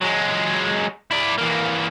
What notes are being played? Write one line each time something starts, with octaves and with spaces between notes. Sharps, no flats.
F#3 G#3
E4 D5
E3 A#3